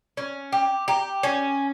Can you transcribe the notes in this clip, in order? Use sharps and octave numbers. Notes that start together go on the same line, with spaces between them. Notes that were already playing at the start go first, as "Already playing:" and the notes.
C#4
G4 G5
G4 A#5
C#4 G#5